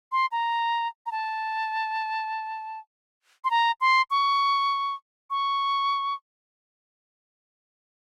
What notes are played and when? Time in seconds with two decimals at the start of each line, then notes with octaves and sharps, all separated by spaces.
0.12 C6
0.32 A#5
1.06 A#5
1.11 A5
3.44 C6
3.50 A#5
3.81 C6
4.10 C#6
5.30 C#6